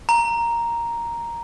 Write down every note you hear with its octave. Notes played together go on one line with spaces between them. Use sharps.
A#5